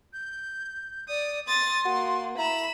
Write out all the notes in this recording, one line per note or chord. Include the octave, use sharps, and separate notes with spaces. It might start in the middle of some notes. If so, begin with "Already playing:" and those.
G6
D5 D#6
C6 D#6 A6
A#3 F#4
E4 A#5 B5 E7